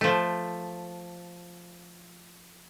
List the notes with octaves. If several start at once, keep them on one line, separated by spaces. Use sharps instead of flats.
F3 A3